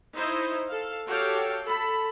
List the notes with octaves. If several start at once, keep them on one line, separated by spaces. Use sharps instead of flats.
D#4 E4 C5 D#5
A4 F5
F#4 G4 A4 C#5 F5 G5
A4 B5